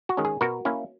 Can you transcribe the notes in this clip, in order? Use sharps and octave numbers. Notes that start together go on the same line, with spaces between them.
F#4
D#3 G#3 C#4
G#4
B2 F#4 A#4
A#3 C#4 E4